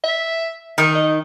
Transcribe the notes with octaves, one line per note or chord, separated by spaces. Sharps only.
E5
D#3 D#4 A#4
D#5